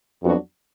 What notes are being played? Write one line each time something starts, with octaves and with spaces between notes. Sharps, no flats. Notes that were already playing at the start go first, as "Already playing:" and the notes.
F2 F#3 B3 D4 F#4